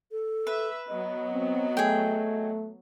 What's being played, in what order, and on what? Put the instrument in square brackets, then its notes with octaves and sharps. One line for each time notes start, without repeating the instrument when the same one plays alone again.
[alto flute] A4
[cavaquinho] B4 [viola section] E5
[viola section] F#3 B3 [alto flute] D#5
[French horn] C4
[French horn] A3 [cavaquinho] G#4 G5